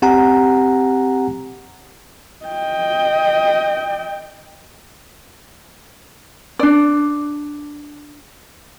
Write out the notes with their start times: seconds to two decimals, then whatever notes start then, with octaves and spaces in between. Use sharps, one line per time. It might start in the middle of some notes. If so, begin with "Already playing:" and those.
0.02 C4 G4 F#5 G#5 A#5
2.46 D#5 G5
6.59 D4 D5